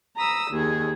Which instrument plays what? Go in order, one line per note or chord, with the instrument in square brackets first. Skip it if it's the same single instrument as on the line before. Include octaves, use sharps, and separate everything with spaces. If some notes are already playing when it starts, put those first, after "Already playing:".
[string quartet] A#5 B5 D#6 E6
D#2 G#4